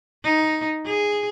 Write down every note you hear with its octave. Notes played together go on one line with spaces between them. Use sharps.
D#4
G#4